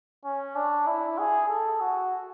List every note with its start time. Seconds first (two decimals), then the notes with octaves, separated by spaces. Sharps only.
0.25 C#4
0.55 D4
0.87 E4
1.19 G#4
1.49 A4
1.81 F#4